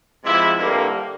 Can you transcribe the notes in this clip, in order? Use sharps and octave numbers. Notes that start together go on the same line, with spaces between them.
C3 F3 G#3 E4
G2 D3 G3 A#3